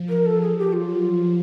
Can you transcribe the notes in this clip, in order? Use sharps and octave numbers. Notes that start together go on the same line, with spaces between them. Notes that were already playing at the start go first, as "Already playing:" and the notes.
Already playing: F3
A#4
A4
F3 G#4
G4
F#3 F4
F3